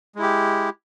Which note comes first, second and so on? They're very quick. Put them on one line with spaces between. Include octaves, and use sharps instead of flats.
G#3 E4 G4